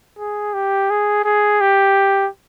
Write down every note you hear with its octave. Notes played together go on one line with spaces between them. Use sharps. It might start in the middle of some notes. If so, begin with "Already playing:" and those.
G#4
G4
G#4
G#4
G4